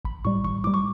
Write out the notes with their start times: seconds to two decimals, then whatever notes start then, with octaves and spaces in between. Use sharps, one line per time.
0.05 A1 B5
0.25 A2 G3 C#6
0.44 A1 C#6
0.64 A2 D6
0.67 G3
0.74 C#6